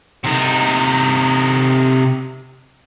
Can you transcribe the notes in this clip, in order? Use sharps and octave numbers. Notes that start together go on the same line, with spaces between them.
C3 D#4